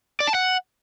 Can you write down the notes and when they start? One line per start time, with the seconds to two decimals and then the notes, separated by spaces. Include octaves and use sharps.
0.20 D5
0.28 A5
0.35 F#5